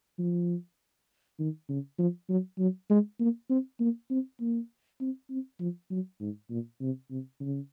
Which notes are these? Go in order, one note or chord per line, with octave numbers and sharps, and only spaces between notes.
F3
D#3
C#3
F3
F#3
F#3
G#3
A#3
C4
A#3
C4
A#3
C4
C4
F3
F#3
G#2
A#2
C3
C3
C#3